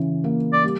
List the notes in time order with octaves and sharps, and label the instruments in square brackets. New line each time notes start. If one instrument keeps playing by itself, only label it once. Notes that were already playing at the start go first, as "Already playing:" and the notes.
Already playing: [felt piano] C#3 E3
A#3
[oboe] D5
[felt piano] G3